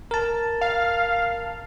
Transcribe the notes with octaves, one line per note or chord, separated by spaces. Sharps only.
A#4 A5
F5